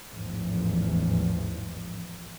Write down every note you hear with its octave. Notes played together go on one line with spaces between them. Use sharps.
A1 E2 G#2 F3